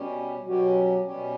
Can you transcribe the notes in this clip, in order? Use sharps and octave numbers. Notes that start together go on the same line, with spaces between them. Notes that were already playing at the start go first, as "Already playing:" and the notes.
Already playing: B2 G3 C#4 G4
B2 F#3 G3 C#4 G4
B2 G3 C#4 G4